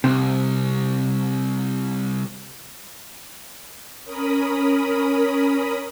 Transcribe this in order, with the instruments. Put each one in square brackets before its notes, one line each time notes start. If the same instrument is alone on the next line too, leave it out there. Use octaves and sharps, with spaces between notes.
[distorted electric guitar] C2 [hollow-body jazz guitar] C3
[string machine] C#4 A#4 B5 D#6